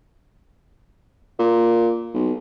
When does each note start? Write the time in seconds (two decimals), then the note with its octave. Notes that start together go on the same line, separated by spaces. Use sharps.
1.39 A#2
2.14 B1